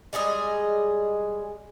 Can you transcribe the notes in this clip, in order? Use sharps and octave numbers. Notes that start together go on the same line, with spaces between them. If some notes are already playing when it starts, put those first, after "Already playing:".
G3 G#3 G#4 D#5